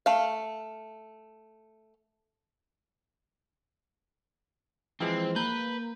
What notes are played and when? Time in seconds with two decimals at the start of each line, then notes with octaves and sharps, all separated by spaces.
0.06 A3 F5
5.00 E3 F3 G#3 C4
5.36 A#3 B4 G6